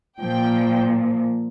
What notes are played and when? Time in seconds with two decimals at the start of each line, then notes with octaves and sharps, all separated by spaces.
0.20 A#2 F3 G5